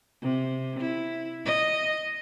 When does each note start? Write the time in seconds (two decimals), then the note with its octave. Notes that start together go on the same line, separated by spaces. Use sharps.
0.22 C3
0.79 E4
1.45 D#5